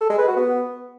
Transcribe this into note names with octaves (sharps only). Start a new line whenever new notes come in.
A4
G#3
B4
F#4
B3